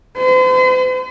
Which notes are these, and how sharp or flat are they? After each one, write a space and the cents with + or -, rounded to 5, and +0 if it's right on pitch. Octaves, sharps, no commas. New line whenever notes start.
C5 -40